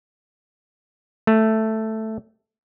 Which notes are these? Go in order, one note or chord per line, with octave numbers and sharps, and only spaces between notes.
A3